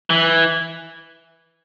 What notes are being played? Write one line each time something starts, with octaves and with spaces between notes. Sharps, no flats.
E3